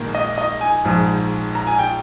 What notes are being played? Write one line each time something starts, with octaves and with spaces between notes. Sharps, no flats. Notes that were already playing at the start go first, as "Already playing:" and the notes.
Already playing: A#1 G#2 D#3 A#3 D#4
D#5
D#5
G#5
A#1 G#2 F3
A#5
G#5
G5